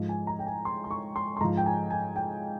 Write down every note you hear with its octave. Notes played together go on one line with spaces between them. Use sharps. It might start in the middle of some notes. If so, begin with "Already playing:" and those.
Already playing: G#2 F3
G#5
A#5
G5
G#5
C6
C6
C#6
C6
C6
G#2 F3 A#5
G5
G#5
G#5
G5